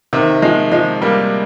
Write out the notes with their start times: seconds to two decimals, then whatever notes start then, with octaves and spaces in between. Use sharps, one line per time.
0.13 C3 D#3
0.42 F3 G#3
0.72 F3 G#3
1.02 G3 A#3